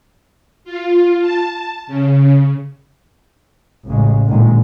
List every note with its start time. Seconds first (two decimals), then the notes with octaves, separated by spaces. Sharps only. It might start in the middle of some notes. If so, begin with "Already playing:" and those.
0.64 F4
1.21 A5
1.87 C#3
3.86 A1 C#3 G#3
4.27 A#2 D3 D#3 G#3